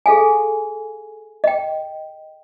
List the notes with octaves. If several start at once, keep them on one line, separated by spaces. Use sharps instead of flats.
G#4 A4 F5 G#5
D#5 G5